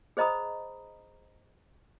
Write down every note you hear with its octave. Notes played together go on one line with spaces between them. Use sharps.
G#4 C5 D#5 A#5 B5 D#6